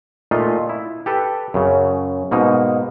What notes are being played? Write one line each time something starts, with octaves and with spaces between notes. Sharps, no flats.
A#2 A3 D#4 F4 D#5
E4
G4 A4 B4
F#2 C#3
G#2 B2 A#3 D#4